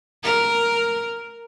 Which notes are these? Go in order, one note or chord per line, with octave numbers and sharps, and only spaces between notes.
A#4